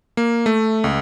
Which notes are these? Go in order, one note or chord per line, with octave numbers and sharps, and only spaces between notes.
A#3
A3
C#2